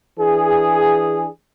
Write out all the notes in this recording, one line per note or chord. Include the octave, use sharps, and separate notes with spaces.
E3 D4 G#4